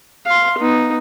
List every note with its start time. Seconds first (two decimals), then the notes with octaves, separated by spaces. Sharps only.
0.26 F5 C6
0.58 B3 D#4